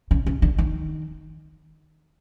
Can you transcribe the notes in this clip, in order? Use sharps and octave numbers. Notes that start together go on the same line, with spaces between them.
C#3
C#3
D3
D#3